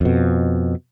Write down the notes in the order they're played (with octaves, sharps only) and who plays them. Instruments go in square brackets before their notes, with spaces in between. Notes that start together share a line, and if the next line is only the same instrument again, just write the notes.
[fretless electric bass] F2 B2